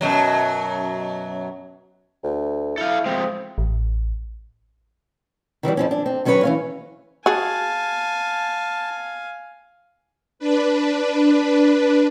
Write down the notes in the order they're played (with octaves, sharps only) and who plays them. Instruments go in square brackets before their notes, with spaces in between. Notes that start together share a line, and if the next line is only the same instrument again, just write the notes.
[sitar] F#2 B2 F#3
[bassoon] D2
[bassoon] E4 [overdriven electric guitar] A4 F5
[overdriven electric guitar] F3 G#3 [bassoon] C4
[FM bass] A1
[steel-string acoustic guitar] D#3 E3 F#3 G3
F2 F3 C#4
D4
C4
D#3 F#3 C#4 D4 B4 C#5
E3 C#4 F5
[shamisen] F#4 G#4 [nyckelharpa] F5 G#5 [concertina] A5
[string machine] D4 B4